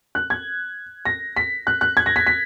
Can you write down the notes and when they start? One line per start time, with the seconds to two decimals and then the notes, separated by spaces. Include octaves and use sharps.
0.15 F#6
0.30 G#6
1.05 A#6
1.37 B6
1.67 F#6
1.81 F#6
1.97 G#6
2.06 A#6
2.16 B6
2.27 B6